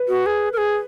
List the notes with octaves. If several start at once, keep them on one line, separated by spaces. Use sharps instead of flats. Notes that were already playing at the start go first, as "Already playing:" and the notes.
Already playing: B4
F#4
G#4
A#4
G#4